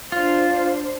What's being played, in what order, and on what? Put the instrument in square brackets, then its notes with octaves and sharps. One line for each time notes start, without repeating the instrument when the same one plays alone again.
[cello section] D4 C5 [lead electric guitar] F4